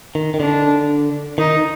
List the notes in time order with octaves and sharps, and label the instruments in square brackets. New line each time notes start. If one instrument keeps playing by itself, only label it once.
[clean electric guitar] D#3
D#3
[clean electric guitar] D3 [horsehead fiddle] D4
[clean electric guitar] D#3 [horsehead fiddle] D#4